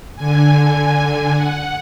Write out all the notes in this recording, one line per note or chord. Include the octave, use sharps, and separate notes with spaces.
D3 G#5
F#5